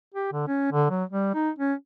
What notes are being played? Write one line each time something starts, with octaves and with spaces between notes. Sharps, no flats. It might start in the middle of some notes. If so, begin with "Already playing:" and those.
G4
D3
C#4
D3
F#3
G3
D#4
C#4